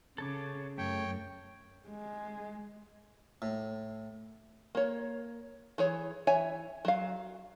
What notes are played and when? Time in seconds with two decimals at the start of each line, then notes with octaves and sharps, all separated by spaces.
0.18 C#3 A4 C#5 D6
0.78 F#2 A3 C#5 G5
1.88 G#3
3.42 A2
4.75 A#3 C#5
5.78 E3 G#4 C#5
6.27 E3 C#5 E5 G#5
6.85 F#3 F5